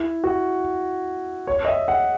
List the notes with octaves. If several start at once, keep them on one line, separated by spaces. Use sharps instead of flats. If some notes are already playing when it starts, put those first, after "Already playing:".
Already playing: E4
F#4
C#5
D#5
E5
F#5